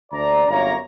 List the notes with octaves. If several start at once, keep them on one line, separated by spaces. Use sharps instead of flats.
D2 D4 D5 A#5
G1 F#2 A#3 C#5 A#5